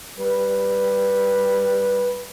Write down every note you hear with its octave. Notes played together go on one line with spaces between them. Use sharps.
G3 B4